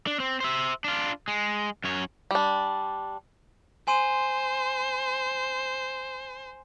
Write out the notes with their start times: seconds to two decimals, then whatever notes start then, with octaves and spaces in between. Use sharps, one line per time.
0.07 D4
0.20 C4
0.40 C5 E5
0.84 D4 F4
1.28 G#3
1.84 F#2 C#5
2.31 G3 D4
3.88 C5 G#5 C6 D#7